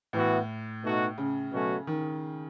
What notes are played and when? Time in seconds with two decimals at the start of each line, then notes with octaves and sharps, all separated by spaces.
0.13 A2 E3 B3 F#4
0.83 B2 A3 D#4 F#4
1.18 C#3
1.52 B2 F#3 A3 C#4 F#4
1.87 D#3